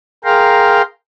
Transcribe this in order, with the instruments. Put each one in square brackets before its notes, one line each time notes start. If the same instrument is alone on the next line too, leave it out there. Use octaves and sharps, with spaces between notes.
[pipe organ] G#4 A#4 F5 G5 A#5 C6